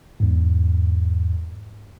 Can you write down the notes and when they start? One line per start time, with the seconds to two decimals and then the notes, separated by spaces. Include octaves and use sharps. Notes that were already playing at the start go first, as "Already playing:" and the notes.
0.20 E2 G#2